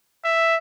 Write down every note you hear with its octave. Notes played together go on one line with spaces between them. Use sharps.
E5